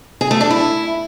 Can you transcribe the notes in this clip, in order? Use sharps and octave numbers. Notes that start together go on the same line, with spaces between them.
G#4
A3
D4
E4